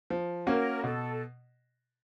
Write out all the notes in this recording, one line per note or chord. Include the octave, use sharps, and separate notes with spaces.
F3
A#3 C#4 F#4 A#4
B2 A4